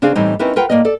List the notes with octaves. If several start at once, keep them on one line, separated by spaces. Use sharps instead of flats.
C#3 C4 D4 G#4 F5
A2 E3 G3 C4 D#4 E4
C4 C#4 D#4 E4 A#4 B4
F4 A#4 B4 F#5 G5
A2 A#3 C#4 D5 D#5
A4 D5